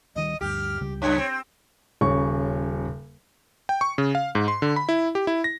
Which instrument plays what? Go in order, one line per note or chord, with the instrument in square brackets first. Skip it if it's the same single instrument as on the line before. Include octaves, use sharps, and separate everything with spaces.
[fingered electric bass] D1 D#3 G3 [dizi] D#5
[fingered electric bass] D2 G2 [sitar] G4 [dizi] F6
[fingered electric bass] C#2 C#3 G3
[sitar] F#2 [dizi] C#5
[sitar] C4
[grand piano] D#1 C#3 C#6
[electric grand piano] G5
C#6
C#3
F5
G#2
C6
D3
B5
E4
G4
E4
A#6